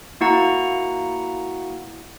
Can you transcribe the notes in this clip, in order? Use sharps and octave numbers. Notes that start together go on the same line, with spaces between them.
A#3 E4 F#4 F#5 A#5